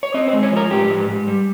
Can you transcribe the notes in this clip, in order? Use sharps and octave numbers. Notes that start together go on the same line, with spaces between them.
C#5
C4 D#5
C5
G#3
C#5
F3
A#4
G#2 G4
G#2
G#2
G3